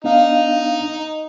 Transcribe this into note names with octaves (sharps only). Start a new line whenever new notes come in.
B3 D4 D#4 F5